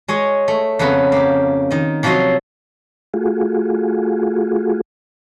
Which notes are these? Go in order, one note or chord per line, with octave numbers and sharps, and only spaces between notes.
G#3 C#5 D#5
A3
F2 C#3 B3 B4 A#5
A#3 G4
D#3 D#5
C3 F3 F#3 F#4 D#5 C6
A3 F4 F#4 G#4